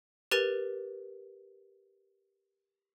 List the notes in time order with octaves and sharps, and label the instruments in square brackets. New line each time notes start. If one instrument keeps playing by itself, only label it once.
[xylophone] G4 A#4 B4 A6 D#7 F7